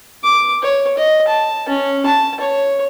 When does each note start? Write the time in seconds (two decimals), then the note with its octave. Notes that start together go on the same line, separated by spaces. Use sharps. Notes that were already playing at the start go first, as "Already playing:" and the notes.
0.24 D6
0.63 C#5
0.97 D#5
1.28 A5
1.68 C#4
2.06 A5
2.40 C#5